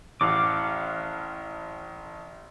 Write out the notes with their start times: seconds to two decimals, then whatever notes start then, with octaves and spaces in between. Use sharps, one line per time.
0.21 A1 F5 F#5 D6